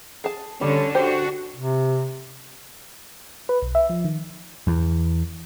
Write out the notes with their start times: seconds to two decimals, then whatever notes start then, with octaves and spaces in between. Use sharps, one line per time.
0.24 G#4 A5
0.61 D3 G3 C#4 C#5
0.95 D4 F#4 G4 C5
1.56 C3
3.49 B4
3.62 B1
3.75 E5
3.90 F3
4.05 D#3
4.67 E2